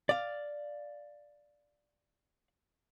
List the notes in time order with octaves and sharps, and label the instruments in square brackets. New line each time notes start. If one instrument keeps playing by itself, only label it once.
[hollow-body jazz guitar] D5 F5